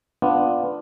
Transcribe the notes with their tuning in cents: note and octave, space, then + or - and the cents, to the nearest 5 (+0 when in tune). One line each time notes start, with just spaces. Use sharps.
B3 +10 D4 +5 F4 +0